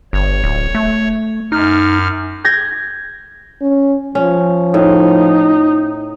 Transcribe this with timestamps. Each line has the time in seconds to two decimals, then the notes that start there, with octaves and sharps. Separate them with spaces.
0.13 G1 C#5
0.44 D1
0.75 A3
1.52 F#2 D#4 F6
2.44 G6 G#6 A#6
3.61 C#4
4.15 F3 C#4
4.74 A2 D#4